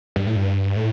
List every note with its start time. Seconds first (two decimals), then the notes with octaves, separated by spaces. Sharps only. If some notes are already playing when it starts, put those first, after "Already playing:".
0.16 G2
0.27 A2
0.36 G2
0.76 A2